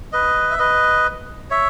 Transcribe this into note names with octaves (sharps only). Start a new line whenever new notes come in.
B4 D#5
E5
B4 D#5
C#5 E5